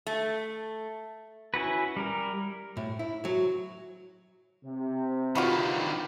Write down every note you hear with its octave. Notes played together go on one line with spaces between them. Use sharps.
A3
C#4 E4 F#4 B4
G3 A#4
A2
E4
F#3
C3
D3 D#3 F4 F#4 B4